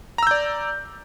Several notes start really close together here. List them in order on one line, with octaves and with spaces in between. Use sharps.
A#5 E6 G6 D5